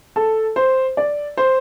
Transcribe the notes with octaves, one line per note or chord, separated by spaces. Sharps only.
A4 A5
C5
D5
C5